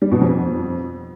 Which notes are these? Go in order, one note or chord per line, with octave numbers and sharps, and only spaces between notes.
G3
B2
F2